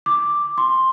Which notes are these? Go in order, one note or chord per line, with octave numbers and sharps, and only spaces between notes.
D6
C6